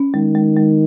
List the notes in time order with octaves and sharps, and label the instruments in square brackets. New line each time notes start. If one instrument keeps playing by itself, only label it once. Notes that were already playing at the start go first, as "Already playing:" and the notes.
Already playing: [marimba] C#4
[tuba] D#3 [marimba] G#3
[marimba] G#3
G#3